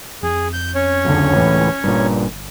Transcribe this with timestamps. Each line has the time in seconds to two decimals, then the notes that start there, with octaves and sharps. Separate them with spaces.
0.23 F2 G#4
0.53 G6
0.75 C#4 C#5
1.05 F#1 C#2 D3
1.35 C#2 A2 E3
1.84 G1 G2 A#2